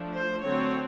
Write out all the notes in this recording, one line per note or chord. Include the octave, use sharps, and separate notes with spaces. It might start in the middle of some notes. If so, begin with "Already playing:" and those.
Already playing: F3 A3 D4
C5
D3 F#3 A3 C4 C#5